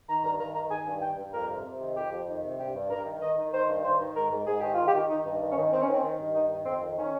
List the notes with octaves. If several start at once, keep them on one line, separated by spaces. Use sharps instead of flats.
D#3 A#5
G2 A#5
D#3 A#5
D#3 A#5
D#3 G#5
G2
G2 G5
G2
F2 A#4
C3
C3
D#3
F2 G4
F2
D#3
C3
G2 G4
G2
G2 A#4
D#3
D#3 D#5
D#3
D#3 C5
G2
D#3 C5
D#3
G#2 A#4
G#2
G#2 G#4
D#3 G4
D#3 F4
G4
D#3
D#3 D#4
G2
D#3
C#4
D#3
D#3 C4
C#4
D#3 C4
D#3
G2
D#3 D#4
D#3
F2 C4
D#3
D#3 C#4